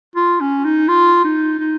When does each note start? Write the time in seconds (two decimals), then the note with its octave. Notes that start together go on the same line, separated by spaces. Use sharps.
0.16 F4
0.40 C#4
0.64 D#4
0.88 F4
1.24 D#4
1.59 D#4